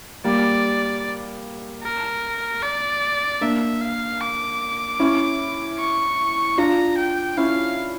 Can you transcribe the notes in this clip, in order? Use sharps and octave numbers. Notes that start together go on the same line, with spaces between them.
G3 A#3 D5
A#4
D5
A#3 D4 E5
F5
D6
C#4 E4
C#6
D4 F4 A#5
G5
C#4 E4 F5